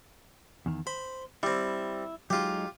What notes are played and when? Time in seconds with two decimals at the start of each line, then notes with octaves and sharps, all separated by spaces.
0.66 E2 D#3
0.87 C5 B5
1.43 G3 C4 E4
2.30 F#3 G#3 D#4 F4 G4